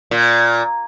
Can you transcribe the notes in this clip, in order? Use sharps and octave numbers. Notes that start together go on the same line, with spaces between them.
A#2